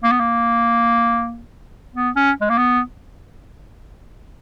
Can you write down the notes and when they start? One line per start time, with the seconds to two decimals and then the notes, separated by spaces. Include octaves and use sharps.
0.03 A#3
0.12 B3
0.20 A#3
1.95 B3
2.16 C#4
2.41 G#3
2.50 A#3
2.58 B3